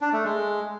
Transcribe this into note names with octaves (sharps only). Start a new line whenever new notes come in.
D4
A3
G#3